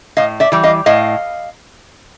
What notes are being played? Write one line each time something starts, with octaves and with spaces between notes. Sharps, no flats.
A2 D#5 F5
D5 E5
E3 G3
D#5 F5
A2 D#5 F5